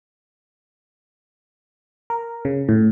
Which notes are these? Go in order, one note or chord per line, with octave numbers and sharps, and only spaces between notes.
A#4
C#3
A2